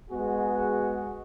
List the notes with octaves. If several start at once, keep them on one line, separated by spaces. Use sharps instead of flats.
G#3 B3 F#4 G#4